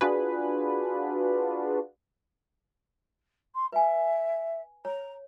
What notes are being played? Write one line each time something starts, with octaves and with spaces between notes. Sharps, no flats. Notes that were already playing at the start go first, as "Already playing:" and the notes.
D4 F4 F#4 G#4 B4
C6
B4 E5 G#5
C#5 A#5